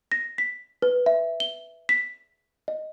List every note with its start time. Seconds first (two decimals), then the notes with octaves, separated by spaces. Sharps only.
0.12 A#6
0.38 B6
0.82 B4
1.06 E5
1.40 G7
1.89 B6
2.68 D#5